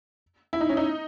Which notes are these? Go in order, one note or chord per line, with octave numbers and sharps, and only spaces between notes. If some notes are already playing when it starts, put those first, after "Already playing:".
E4
D#4
C#4
D#4